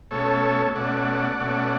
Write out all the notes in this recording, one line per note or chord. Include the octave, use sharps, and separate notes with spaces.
B2 A3 C#4 A4 C#5
B2 A3 C#4 D5 F#5
B2 A3 C#4